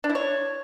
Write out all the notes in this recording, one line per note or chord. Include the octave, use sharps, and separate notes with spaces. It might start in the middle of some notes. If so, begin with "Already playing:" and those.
D4
E4
C#5